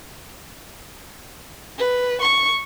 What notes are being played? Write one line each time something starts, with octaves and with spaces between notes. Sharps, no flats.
B4
C#6